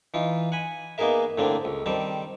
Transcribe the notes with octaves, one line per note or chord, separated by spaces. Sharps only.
E3 D#4 F4
F#5 G#5 B5
A#3 B3 D#4 G#4 A#4 E5
A2 D3 A#3 C4 D4
C#2
D#3 G3 C4 A5